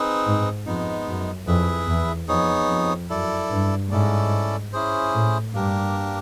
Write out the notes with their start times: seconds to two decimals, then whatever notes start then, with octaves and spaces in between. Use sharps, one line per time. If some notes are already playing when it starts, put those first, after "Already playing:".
Already playing: C4 D#4 G#4 B4
0.26 G#2
0.66 F2 G#3 B3 D#4
1.07 F#2
1.47 F2 E4 G#4 B4 E5
1.87 E2
2.28 F2 B3 D#4 G#4 C#5
2.69 F2
3.10 F#2 E4 A4 D5
3.51 G2
3.91 G#2 C#4 E4 A4 D5
4.73 C#4 E4 G#4 C5
5.14 A2
5.54 G2 A#3 D4 G4 A#4